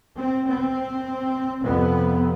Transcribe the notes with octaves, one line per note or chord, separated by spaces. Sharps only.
C4
C4
F2 C3 B3